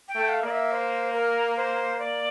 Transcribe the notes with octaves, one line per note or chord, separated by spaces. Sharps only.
G5
A3
F5
A#3 D5
E5
C5
A#4
C5
D5